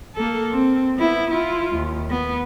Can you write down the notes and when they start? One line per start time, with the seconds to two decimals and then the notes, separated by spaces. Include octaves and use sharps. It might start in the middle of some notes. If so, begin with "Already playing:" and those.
0.15 A#3 A4
0.52 C4
0.97 B3 E4
1.31 E4 F4
1.76 D#2
2.10 B3